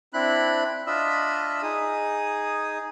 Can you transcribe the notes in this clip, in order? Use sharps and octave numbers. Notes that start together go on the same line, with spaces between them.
C4 D4 E4 B5 F#6
D4 F4 D#5 E5 B5 E6
D#4 G#4 D#6